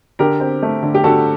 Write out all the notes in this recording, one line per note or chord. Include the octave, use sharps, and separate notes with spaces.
D3 G4 A#4
C4
A3
D3
G4
D3 F#4 A4